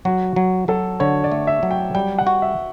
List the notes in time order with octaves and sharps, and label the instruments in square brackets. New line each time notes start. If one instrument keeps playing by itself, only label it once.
[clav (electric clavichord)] F#3 [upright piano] F#4
[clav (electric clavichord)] F#3
[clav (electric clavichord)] F#3 [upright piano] A4
[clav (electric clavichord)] D3 [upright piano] C#5
[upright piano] D5
[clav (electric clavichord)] A3
[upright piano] E5
[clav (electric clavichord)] F#3
[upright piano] G5
[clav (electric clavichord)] G3 [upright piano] G5
[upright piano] F#5
[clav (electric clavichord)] F#4
[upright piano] E5